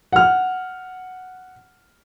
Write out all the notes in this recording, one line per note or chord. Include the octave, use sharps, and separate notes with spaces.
F#5 F6